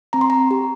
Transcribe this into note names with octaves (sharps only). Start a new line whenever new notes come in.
C4 A#5
C6
A#5
G4